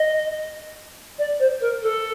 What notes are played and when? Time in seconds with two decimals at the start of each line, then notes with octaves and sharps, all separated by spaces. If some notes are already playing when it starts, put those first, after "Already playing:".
Already playing: D#5
1.18 D5
1.39 C5
1.60 A#4
1.81 A4